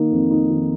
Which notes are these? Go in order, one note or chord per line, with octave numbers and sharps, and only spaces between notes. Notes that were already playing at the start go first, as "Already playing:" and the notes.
Already playing: D#3 A#3 D#4
F2
D#4
D#3